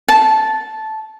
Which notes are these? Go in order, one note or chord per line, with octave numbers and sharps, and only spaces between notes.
A5